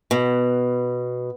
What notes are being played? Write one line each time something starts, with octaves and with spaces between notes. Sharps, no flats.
B2